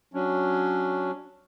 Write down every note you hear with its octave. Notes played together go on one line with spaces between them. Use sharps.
F#3 C#4 D4